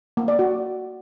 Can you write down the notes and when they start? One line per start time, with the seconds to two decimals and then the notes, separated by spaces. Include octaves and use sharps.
0.17 A#3
0.28 D5
0.39 F#4